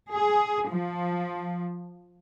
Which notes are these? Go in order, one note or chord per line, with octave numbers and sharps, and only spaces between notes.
G#4
F3